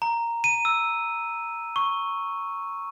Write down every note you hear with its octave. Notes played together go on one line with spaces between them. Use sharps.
A#5
D#7
E6
C#6